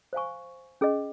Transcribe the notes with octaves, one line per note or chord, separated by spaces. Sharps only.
C5 F5 G#5 C#6
C#4 G#4 D#5